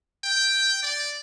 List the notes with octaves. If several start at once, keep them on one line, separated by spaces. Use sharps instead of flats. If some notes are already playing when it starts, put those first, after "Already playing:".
G5
D5